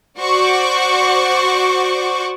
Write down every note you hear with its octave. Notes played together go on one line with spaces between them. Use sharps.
F#4 C5 D5 F#5 C#6 D6